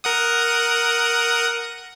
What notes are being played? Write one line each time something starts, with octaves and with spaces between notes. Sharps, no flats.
A#4 F#5 D#6